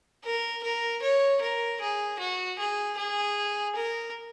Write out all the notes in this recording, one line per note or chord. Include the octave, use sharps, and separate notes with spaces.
A#4
A#4
C#5
A#4
G#4
F#4
G#4
G#4
A#4